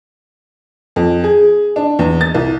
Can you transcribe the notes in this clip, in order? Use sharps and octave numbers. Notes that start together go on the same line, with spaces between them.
F2
G#4
D4
E2
A6
C2